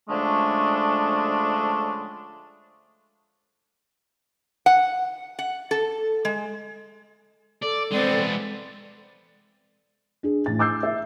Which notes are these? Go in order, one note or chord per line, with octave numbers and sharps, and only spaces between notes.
D3 F3 G#3 A3 C#4 D4
F#5
F#5
A4
G#3
A4 D5
G#3 B3 C4 D5
D4 G#4
A1 A6
D6 E6 G6 C7
E5